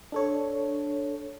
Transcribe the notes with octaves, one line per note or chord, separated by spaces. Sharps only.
D4 A4 C#5